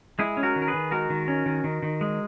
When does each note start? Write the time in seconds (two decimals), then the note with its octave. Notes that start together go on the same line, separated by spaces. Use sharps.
0.19 G#3 E4 G#4
0.37 C#4
0.43 F#4 A#4
0.56 D#3
0.62 A#4
0.68 G#4 B4
0.74 D#3
0.91 G#3 F#4 A#4
1.10 D#3
1.28 C#4
1.46 D#3
1.64 D#3
1.83 D#3
2.01 G#3